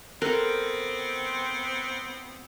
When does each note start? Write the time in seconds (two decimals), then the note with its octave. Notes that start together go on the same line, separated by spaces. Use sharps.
0.22 B3 C4 A4 A#4 A#5 F#6